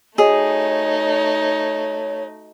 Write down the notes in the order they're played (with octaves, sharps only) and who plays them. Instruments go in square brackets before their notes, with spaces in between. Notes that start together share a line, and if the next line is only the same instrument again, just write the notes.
[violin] A3 D#4 [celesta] F#4 D#5 [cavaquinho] G#4 [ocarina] C#5